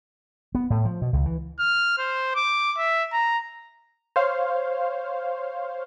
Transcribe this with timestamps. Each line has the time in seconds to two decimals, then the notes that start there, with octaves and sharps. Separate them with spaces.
0.55 B3
0.70 A2
0.85 F3
1.02 B2
1.13 C#2
1.26 E3
1.59 F6
1.98 C5
2.35 D6
2.78 E5
3.13 A#5
4.16 C5 C#5 F5